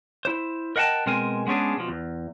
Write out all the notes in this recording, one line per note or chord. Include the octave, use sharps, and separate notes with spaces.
E4 C5
A#4 D#5 F#5 G5 A5
B2 G#3 C4 A#4 G#5
G#3 B3 C#4 D4 G#4
B2 F3
E2